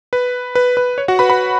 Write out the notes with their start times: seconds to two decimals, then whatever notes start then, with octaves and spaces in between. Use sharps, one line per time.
0.13 B4
0.55 B4
0.77 B4
0.98 C#5
1.08 F#4 F#5
1.19 B4 B5
1.30 B4 B5